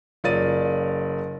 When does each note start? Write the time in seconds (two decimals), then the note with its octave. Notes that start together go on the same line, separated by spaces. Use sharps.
0.24 F#1 F4 C#5 D5 A6 D#7